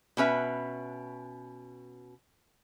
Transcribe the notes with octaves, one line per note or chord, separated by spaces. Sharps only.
B2 C#4 B4 E5